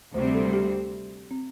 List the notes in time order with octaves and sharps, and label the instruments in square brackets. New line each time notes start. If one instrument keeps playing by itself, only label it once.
[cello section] D2 C3 G3 C4 [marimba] C5
[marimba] A4
G4
C4